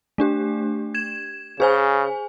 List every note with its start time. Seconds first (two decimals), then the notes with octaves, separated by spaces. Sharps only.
0.18 A3 D4 G4
0.94 G#6 E7
1.60 C#3 G#4 C5 G#5